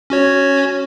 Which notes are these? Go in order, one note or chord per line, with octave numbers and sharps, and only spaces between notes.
C#4 F#4 C#5